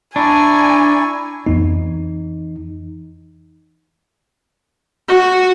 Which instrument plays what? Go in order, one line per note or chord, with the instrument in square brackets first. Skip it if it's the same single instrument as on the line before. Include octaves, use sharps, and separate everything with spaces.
[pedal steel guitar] D4 [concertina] E4 A#5 C#6 [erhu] G#5
[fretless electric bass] F2 B3 [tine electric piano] E3 D#4
[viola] F#4